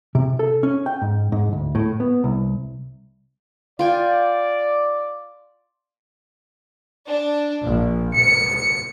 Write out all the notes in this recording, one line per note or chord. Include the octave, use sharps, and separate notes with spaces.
C3
A4
C#4
G5
G#2
G#2
D2
A2
B3
C2
F4 D5 G5 G#5
D4
A#1
C#7